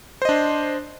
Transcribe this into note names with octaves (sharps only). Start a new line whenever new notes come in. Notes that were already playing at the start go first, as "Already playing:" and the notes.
D4 C5 D#5